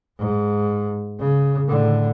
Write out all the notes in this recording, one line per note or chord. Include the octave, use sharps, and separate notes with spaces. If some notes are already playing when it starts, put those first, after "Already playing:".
G#2
C#3
A2 D3